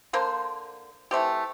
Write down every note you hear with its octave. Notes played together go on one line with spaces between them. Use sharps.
D3 A#3 C5
E3 A3 C4 G4